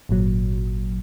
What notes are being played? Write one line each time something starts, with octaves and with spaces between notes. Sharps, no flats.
G#1 A#2 F#3